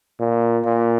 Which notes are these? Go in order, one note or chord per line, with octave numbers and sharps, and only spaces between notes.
A#2
A#2